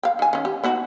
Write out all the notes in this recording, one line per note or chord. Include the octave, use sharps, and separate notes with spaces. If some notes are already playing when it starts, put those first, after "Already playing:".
F5 G5
D#3 G#5
D#3 C#4
G4
B3 D#4 F#4